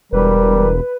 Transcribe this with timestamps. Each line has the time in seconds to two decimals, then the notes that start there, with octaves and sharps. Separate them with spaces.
0.13 E1 G3 A#4 B4